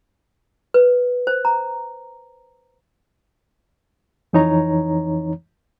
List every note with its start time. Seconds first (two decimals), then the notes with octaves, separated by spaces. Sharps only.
0.74 B4
1.27 C5
1.45 A#5
4.33 F2 E3 D#4 C#5 A#5